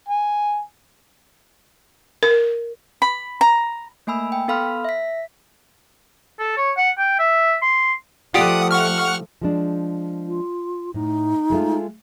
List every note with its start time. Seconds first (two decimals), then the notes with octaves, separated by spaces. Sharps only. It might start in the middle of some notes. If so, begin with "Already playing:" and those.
0.08 G#5
2.23 A#4
3.02 B5
3.41 A#5
4.07 A3 A#3 G#5 B5 E6
4.32 G5
4.48 B3 A4 F5 B5 C6 F6
4.84 E5 B6
6.40 A4
6.57 C#5
6.77 F#5
6.98 G5
7.19 E5
7.62 C6
8.34 F3 A3 F4 G4 D5 F#5 D#6
8.71 F#5 C#6 F6
9.41 F3 G#3 D4
10.27 F4
10.94 A2 D#4
11.50 G#3 A3 F4